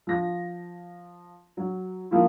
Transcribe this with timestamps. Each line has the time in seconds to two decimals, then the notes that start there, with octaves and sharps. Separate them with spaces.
0.07 F3 A#6
1.57 F#3
2.11 F3 A#3 E4